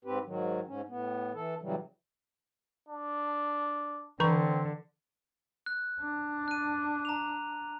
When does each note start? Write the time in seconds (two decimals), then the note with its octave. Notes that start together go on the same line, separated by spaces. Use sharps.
0.05 G#2 C4 G4 B4
0.25 G#2 D#3 F#3
0.67 G#2 C#4
0.88 A2 B3
1.34 E3 A4
1.61 A2 C#3 E3 F#3 G3
2.89 D4
4.20 D3 E3 C4 A#5 C#6
5.66 F#6
6.01 D4
6.48 F#6 D#7
7.05 A#5 F7